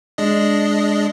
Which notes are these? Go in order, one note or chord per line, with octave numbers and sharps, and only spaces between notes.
G#3 D4 D#5